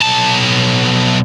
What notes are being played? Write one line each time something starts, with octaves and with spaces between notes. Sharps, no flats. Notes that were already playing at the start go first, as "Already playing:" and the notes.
B1 A5